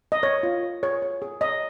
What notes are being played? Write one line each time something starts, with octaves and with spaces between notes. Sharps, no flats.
D#5
C#5
F4
C#5
G#4 C#5
C#5
G#4
C#5 D#5